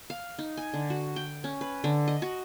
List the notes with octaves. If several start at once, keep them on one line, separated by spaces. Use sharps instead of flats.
F5
D#4
G#5
D3
F#4
G5
C#4
B4
D3
D#5
F#4